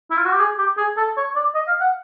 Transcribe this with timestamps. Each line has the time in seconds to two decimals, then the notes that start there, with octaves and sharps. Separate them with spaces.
0.11 E4
0.17 F4
0.25 F#4
0.33 G4
0.40 G#4
0.58 G4
0.77 G#4
0.97 A4
1.17 C#5
1.36 D5
1.55 D#5
1.68 F5
1.81 F#5